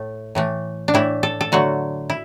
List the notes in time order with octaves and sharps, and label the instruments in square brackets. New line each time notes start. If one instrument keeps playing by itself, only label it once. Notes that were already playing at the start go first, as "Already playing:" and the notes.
Already playing: [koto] A2 A3
A2 E3 A3
D4
A2 E3 A3 E4
A4
A4
D3 F#3 A3 F#4
E4